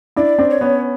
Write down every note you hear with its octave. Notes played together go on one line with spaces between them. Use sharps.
D4 E4 D5
C4 D4
C#5
B3 C#4